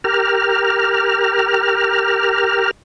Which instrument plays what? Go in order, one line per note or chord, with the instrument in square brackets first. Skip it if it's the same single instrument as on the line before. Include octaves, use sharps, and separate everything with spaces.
[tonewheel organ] G4 A#4 F6